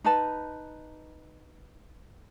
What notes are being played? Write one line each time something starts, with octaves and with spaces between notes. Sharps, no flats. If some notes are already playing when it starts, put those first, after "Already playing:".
D#4 B4 A5